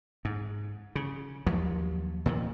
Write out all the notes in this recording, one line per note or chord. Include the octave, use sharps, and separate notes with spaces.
G#2
C#3
D#2 F3 F#3
A#2 D#3 F3